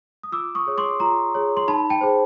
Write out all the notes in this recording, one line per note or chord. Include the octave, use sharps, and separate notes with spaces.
D#6
F4 D6 E6
C#6 D#6
G#4 C#5
C6 D6
F4 A#5 C6
G#4 C#5
C6
D#4 A5 B5
G5 A5
G#4 C5